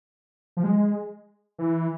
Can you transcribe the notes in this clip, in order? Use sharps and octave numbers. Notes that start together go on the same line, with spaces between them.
F3
G#3
E3